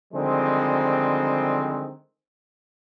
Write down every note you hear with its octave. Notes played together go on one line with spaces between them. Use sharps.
D3 D#3 F3 G3 G#3 C4